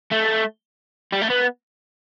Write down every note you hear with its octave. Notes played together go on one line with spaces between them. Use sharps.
A3
G3
A3
B3